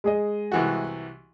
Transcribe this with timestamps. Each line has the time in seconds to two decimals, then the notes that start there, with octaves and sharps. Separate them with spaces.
0.04 G#3 G#4 D#5
0.52 C2 E3 F#4